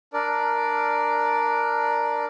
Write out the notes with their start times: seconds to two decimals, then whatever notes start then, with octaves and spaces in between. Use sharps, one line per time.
0.14 D4 A#4 D5